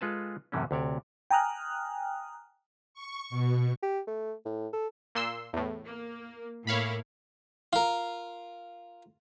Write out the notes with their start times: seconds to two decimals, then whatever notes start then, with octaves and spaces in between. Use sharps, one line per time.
0.01 G#3 F4 A4 B4 G#5 A5
0.52 F#2 A2 C3 E3 A3 C#4
0.71 D2 C3 C#5 D5
1.31 G5 G#5 A#5 D#6 F6 F#6
2.94 C#6
3.30 B2
3.83 G4
4.07 A3
4.45 A2
4.73 A4
5.15 A#2 C6 E6
5.53 E2 A2
5.83 A#3
6.67 A2 A#3 E4 C#5 F5 B5
7.73 F4 A#4